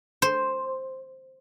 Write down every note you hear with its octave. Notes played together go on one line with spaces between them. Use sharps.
C5